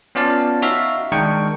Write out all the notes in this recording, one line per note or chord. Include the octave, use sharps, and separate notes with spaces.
B3 C#4 F4 D5 F5 A5
D#4 F#4 E5 F5
D#3 G#3 D4 A#4 G5 C#6